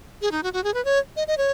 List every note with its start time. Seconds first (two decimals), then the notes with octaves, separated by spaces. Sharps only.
0.22 G#4
0.31 D#4
0.43 F#4
0.53 F#4
0.64 G#4
0.74 B4
0.85 C#5
1.16 D#5
1.28 D#5
1.38 C#5